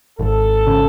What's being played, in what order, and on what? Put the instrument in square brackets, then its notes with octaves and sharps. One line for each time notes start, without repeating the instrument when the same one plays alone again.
[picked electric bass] G#1 [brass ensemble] A4
[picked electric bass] C#3